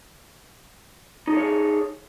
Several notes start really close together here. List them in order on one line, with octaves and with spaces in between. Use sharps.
D#4 A4 C#5 G#4